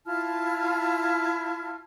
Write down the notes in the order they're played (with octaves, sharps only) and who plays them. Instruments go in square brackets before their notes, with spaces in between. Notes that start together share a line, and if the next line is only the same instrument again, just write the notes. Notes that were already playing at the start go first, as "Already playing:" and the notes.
[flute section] E4 F4 A5 F6